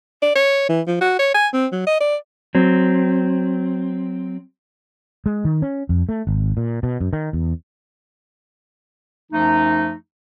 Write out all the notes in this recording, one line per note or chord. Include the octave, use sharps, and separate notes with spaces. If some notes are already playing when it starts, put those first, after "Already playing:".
D5
C#5
E3
F3
F#4
C#5
G#5
C4
F#3
D#5
D5
F#3 C4
G#3
D#3
C#4
F2
A3
G#1
A#2
B2
F#2
D#3
E2
F#2 F3 A3 D#4